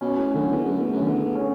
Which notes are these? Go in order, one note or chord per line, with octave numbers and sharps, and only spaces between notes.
B2 C#4
A2
F#2 D3
E2
F#2 A3
E2
F#2
E2 D3
E2
C#4